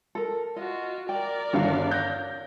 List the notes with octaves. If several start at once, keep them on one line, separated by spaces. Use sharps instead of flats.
A4 A#4
F4 F#4 D#5
A#4 D5 G5
G1 G2 D#3 C#4 F#4 F5
G6 A#6